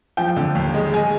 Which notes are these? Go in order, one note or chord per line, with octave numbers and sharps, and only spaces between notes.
F3 G5
D3
D#2
G#3
G#3 G#5